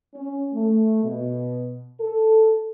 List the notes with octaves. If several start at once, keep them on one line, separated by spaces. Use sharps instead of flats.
C#4
A3
B2
A4